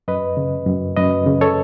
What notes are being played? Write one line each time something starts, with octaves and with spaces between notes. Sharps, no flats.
F#2 B4 D#5
C#3
F#2
F#2 B4 D#5
C#3
A4 C#5